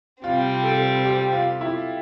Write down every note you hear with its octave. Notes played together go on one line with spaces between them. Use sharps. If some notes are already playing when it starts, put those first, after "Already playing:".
C3 G3 C4 F4
A4
G4
F4
E4